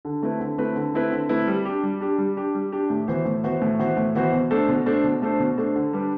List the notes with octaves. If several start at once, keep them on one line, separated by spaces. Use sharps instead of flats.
D3
A3 C4 E4 B4
D3
A3 C4 E4 B4
D3
A3 C4 E4 B4
D3
A3 C4 E4 B4
G3
D4 G4
G3
D4 G4
G3
D4 G4
G3
D4 G4
A2
E3 B3 F#4 C5
A2
E3 B3 F#4 C5
A2
E3 B3 F#4 C5
A2
E3 B3 F#4 C5
B2
A3 D4 A4 C5
B2
A3 D4 A4 C5
B2
A3 D4 A4 C5
B2
A3 D4 A4 C5
D3
G3 D4 G4 B4